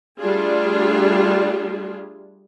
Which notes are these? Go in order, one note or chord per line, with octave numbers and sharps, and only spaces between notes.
G3 A3 D4 F4 G#4